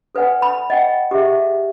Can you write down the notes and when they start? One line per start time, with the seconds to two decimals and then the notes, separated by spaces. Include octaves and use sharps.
0.15 A4 B4 D5 F#5 G#5
0.42 B5
0.70 D#5 F#5 G5
1.11 G4 G#4 E5